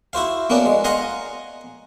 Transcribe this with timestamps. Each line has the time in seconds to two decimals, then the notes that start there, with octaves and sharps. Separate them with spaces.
0.13 E4 F#4 C5 F5
0.50 A#3 B3 C#4 D4 F#4
0.66 G#3
0.84 D#5 F5 F#5 G#5 A#5 C6